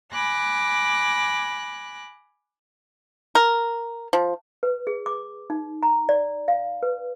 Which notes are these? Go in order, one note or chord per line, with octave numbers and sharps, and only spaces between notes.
G#5 B5 D6 F#6 A#6
A#4
F3
B4
G#4
D6
D#4
A#5
D5
F5
B4